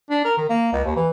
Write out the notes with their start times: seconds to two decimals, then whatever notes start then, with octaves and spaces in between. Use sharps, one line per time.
0.10 D4
0.25 A#4
0.37 D#3
0.49 A#3
0.72 C#2
0.84 D#2
0.96 E3